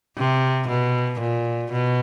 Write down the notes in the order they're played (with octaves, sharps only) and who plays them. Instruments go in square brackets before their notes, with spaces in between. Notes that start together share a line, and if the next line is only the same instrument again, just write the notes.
[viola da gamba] C3
B2
A#2
B2